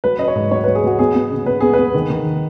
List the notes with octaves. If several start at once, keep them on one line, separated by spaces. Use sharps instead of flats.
F#3 B4
C#4 D#5
C#5
G#2
F#3 C#5
F#3 B4
G#4
F#3 F#4
B3 G#4
B3
C#3
B3 B4
B3 G#4
B3 B4
D#3
D#3